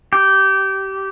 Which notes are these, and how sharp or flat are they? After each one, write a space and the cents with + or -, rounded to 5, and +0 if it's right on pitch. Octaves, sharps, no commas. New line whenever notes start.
G4 -20